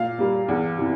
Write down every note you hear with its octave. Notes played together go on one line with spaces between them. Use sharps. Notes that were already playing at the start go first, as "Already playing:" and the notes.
Already playing: A#2 F5
G3 A#3
E2
C3 E3